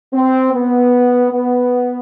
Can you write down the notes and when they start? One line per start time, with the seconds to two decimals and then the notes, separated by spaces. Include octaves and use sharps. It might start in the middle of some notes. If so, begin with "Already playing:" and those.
0.14 C4
0.53 B3
1.31 B3